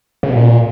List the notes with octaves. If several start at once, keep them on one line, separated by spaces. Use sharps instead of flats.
C#3
B2
A#2